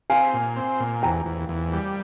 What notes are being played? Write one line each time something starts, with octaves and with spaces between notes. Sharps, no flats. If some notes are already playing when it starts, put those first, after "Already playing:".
C4 F5 G#5
A#2
C4
A#2
E2 G5 A#5
E2
E2
G3